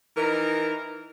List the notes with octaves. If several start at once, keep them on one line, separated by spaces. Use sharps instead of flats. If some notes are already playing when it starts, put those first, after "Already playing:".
E3 D#4 A#4